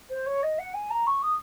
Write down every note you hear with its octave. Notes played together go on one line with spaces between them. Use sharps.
C5
C#5
D#5
F#5
G#5
A#5
C#6
D#6